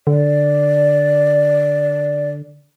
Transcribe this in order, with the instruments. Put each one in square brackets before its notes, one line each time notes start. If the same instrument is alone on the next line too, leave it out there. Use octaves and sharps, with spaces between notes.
[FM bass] D3 [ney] D5